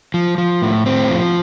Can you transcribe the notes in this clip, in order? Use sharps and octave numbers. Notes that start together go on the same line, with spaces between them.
F3
F3
A2
A2 C4
F3